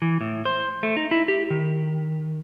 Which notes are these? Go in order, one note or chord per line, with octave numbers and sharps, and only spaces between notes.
E3
A2
C5
A3
D#4
E4
G4
D#3